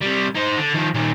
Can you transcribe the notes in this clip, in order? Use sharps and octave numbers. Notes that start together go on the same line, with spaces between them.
C3 G3
D#4 C5
D3
D#3 F3
A#2 D#3